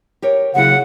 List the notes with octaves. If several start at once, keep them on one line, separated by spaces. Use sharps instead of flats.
G4 A#4 C#5
D#2 C#3 F#3 E4 F#5